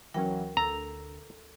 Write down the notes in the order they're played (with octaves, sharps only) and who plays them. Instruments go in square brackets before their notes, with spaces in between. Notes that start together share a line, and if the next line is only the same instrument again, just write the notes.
[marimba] D2 A#4 G5 [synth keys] E3 F#3 C#4
[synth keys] D2 [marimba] A4 E6 [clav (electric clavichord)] A#5